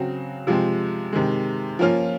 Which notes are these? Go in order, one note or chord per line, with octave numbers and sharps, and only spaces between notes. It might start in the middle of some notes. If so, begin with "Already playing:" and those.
Already playing: C#3 F#3 C4 F#4
C3 F3 G#3 C4
C3 D#3 G#3
F3 A#3 C#4 F4